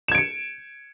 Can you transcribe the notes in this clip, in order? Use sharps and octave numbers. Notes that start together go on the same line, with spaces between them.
G#6 C#7 D7 E7